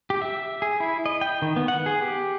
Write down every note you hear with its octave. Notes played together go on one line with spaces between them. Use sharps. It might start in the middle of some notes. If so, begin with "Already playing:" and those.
G4
E5
G#4
E4
D#5
G5
D#3
B3
F#5
G#4
G4